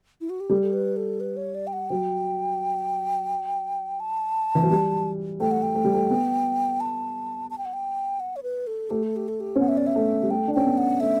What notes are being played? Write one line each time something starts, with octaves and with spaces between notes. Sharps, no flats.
E4
F#4
G4
G3 A4
A4
B4
A4
B4
C#5
D5
G5
F#5
F#3 G5
A5
E3
F#3
G3
A3 G5
F#5
G5
A3
G3
A3
B3
A5
A5
G5
F#5
G5
F#5
C#5
B4
A4
A3 G4
A4
G4
A4
G4
C#4
B3 F#5
E5
D5
E5
A3
G3
A3 G5
D4
C#4 G5
B3
F#5
A3 E5